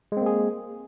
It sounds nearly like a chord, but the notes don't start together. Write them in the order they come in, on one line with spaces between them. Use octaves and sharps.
G#3 C4 A#3 G#4